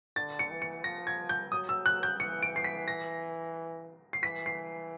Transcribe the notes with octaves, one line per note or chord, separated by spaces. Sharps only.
D3 A6
C#7
E3
C#7
F3 A#6
G#6
G6
F#3 D#6
E6
F#6
G6
E3 C#7
D7
C7
B6
A#6
C7
E3 B6
C7